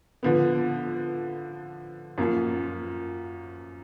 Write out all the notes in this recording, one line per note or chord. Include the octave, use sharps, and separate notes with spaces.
D3 F3 B3
F#2 F3 A#3